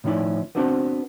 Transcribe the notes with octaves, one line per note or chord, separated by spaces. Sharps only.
A2 D#3 F3 C#4 E4 D5
B3 C4 D4 F#4 A4 C5